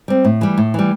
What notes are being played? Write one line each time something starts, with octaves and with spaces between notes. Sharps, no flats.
G3 C4
A2
E3 G3
A2
E3 G3